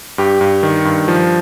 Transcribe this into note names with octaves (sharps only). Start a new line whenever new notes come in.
G2 G4
G2
D#3
G2
F3